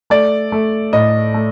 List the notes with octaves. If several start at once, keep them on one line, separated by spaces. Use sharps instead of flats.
A3 D5
A3
A2 D#5
A3